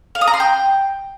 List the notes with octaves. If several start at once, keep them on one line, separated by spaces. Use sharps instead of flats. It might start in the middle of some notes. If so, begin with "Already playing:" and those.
F5
D#6
A#5
C6
G5